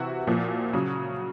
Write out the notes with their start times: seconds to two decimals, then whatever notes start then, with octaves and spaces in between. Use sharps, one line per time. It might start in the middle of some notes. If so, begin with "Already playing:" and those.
Already playing: C3 E3 E4 F#4
0.27 A#2 F3
0.73 C#3 F#3